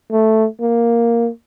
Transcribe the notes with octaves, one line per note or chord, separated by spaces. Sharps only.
A3
A#3